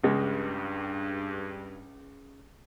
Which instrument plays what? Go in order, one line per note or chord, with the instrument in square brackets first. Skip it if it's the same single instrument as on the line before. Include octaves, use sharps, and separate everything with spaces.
[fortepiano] C#2 G#3 [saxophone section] G2